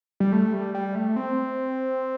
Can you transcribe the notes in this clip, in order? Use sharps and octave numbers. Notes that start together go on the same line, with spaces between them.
G3
A3
G3
G3
A3
C4